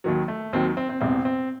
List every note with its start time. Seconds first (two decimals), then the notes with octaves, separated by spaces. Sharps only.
0.04 D#2 D#3 F#3
0.28 A3
0.53 D#2 D#3 F#3 C4
0.77 C4
0.89 C4
1.01 E1 E2 C3 C4
1.25 C4